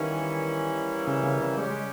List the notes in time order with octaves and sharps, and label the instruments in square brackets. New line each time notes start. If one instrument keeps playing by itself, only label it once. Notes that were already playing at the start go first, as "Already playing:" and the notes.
Already playing: [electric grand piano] D#3 [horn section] E3 G3 A#3 C#4 E4
[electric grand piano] C#3
C#3
C#3
[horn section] C#3 G3 C#4 G4 [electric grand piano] G#3
[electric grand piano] G#3